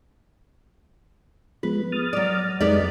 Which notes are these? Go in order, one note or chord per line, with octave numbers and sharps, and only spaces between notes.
F3 G#3 B3 B4
D#6 F6 A6
F#3 D5
F2 G#3 B3 D#4 G4 D5